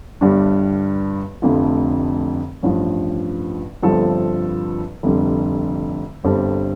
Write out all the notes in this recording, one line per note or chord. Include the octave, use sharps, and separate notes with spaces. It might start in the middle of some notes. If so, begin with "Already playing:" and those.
G1 G2 G3 D4
F1 F2 D3 A3 F4
A1 G2 F3
G1 G2 F3 C4 A4
F1 F2 D3 G3
G1 G2 G3 C4 A4